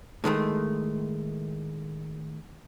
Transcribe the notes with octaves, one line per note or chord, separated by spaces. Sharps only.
A2 D#3 G#3 A3